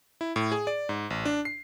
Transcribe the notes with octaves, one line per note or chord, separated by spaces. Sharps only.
E4
A2
G#4
D5
G#2
A1
D4
C7